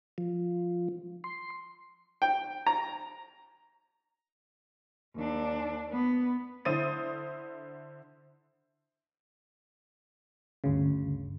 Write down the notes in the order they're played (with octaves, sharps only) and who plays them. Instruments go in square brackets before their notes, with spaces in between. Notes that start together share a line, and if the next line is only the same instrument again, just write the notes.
[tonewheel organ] F3
C6
[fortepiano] G5
A#5
[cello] D#2 D4
B3
[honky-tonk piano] D3 E4 C5 D#6 A6 D#7
[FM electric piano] G1 D2 C#3